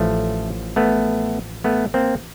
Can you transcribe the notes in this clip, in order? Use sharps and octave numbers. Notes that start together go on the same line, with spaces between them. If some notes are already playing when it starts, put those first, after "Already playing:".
Already playing: A1 A2 F3 A3
A3 B3
A3 B3
A#3 C4